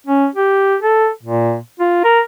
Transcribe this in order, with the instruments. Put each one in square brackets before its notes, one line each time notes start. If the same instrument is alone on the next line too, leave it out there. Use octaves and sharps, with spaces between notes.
[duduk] C#4
G4
A4
A#2
F4
A#4